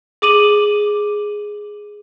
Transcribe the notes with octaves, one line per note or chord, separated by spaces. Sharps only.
G#4 D6 D#7 F#7